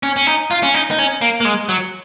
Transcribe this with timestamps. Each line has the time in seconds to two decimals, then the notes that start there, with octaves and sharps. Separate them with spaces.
0.03 C#4
0.17 C#4
0.27 D#4
0.51 F4
0.63 C#4
0.74 D#4
0.91 D#4
0.99 C#4
1.21 A#3
1.41 A#3
1.45 G#3
1.69 F#3